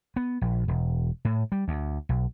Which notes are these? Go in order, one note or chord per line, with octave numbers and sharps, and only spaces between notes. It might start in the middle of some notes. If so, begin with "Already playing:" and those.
B3
A#1
E1
A2
G3
D2
B1